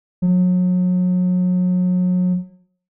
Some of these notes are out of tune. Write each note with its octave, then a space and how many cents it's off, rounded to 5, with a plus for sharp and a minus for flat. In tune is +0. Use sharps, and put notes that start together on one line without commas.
F#3 -35